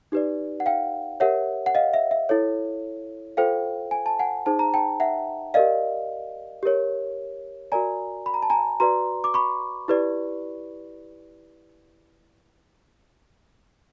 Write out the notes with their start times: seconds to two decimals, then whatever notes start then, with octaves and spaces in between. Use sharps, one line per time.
0.12 D#4 G4 B4 D5
0.60 F#5
0.66 F5 G5
1.20 G4 A#4 C#5 E5 F#5
1.66 F#5
1.75 D#5 F5
1.94 E5
2.11 E5
2.29 E4 A4 C#5
3.37 F4 A4 C5 F5 G5
3.91 G#5
4.06 A5
4.19 F#5 G#5
4.46 D#4 G#4 C5 A5
4.59 A#5
4.74 G5 A5
5.00 E5 F#5
5.54 G4 A#4 D5 D#5 F5
6.63 G4 A#4 C#5
7.72 F#4 A#4 D5 G#5 A#5
8.26 B5
8.34 A#5
8.43 A5
8.50 G#5 A#5
8.80 F#4 B4 D5 A#5 C6
9.24 D6
9.34 B5 C#6
9.88 E4 G4 B4 D5